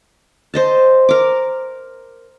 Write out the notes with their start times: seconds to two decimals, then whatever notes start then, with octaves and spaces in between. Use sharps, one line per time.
0.54 C5 D#5 A5
1.09 A#4 D6